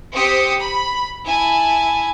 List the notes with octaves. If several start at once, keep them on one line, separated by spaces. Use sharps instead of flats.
C4 G4 C5 D#6 B6 C#7
B5
E4 G#5 A5